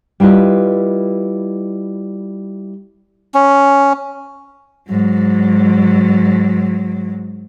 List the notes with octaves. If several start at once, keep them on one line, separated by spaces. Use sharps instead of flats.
G3 E4 F4 B4 D#5
C#4
G#2 F#3